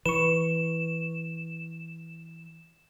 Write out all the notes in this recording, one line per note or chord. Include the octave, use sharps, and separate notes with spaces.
E3 B4 C#6 E7